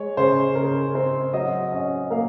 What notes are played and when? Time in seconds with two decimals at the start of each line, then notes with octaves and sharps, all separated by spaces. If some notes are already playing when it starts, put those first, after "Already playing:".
Already playing: G#3 C#5
0.17 C#3 C5
0.55 C#3 A#4
0.95 C4 C5
1.33 F#3 D#5
1.72 C#4 D#5
2.11 A#3 F5